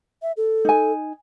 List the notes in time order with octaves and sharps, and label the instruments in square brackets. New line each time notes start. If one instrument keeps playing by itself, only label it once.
[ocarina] E5
A4
[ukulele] D#4 G#5